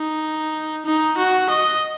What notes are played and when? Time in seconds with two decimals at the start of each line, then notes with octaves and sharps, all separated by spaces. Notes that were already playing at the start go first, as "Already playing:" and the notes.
Already playing: D#4
0.86 D#4
1.18 F#4
1.50 D#5